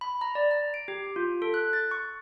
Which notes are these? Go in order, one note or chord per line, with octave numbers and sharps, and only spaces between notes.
B5
A#5
D5
A#5
D7
G4
F4
A4
F#6
A6
C#6